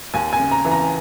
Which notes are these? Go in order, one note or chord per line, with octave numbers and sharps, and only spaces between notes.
D#2 G#5
G#5
C#3
A#5
E3
A#5